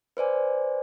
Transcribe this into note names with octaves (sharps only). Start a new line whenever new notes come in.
B4 C5 D5 G#5